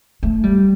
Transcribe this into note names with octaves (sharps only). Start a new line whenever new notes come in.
A3
G3